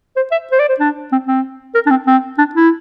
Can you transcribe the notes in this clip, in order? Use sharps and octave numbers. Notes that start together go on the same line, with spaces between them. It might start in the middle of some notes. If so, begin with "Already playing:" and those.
C5
E5
C5
D5
C5
D4
C4
C4
A#4
D4
C4
C4
D4
E4